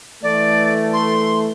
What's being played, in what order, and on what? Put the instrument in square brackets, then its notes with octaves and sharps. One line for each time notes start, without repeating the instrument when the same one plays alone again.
[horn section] E3 A3 [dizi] D5
[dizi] C6